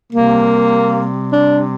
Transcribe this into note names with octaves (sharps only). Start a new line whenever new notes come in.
C3 G3 A#3
D4